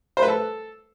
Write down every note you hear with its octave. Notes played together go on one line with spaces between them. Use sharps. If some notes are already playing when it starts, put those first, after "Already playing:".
C5
B4
A4